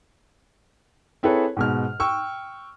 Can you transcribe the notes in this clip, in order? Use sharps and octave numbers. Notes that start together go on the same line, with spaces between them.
C4 E4 G#4 A4 B4 C#5
G#2 B2 F6
G5 C#6 E6